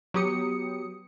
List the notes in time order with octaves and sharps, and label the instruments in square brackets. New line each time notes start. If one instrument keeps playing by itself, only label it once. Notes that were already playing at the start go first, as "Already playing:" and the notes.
[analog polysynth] F#3 B3 G4 D#6 C#7